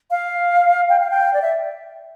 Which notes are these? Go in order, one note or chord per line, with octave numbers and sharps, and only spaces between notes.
F5
G5
F5
G5
D5
E5